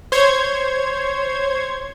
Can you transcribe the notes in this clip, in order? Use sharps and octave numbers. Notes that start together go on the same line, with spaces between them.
C5 C#5 G#6